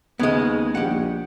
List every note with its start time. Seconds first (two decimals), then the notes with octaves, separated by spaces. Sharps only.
0.19 D#2 C#3 G#3 B3 D#5
0.75 A#1 G4 F#5